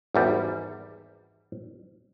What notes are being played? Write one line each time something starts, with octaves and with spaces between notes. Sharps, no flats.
G#1 E2 G3